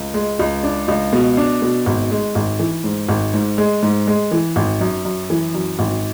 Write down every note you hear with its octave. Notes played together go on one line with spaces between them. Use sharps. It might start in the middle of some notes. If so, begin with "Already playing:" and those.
Already playing: C#2
G#3
C#2
D4
C#2
B2
D4
B2
G#1
G#3
G#1
E3
G#2
G#1
G#2
G#3
G#2
G#3
E3
G#1
F#2
F#2
E3
F#2
G#1